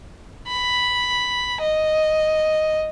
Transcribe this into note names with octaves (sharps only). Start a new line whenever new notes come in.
B5
D#5